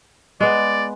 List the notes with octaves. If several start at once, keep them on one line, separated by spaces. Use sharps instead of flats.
G#3 B3 D5